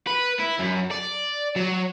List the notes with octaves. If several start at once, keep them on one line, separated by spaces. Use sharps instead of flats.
B4
E4
F#2
D5
F#3